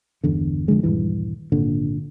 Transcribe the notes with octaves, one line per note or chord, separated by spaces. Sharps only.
G1 E2 D3
F2 D3 G#3
D#1 C#2 G2 E3
G#1 A#2 D3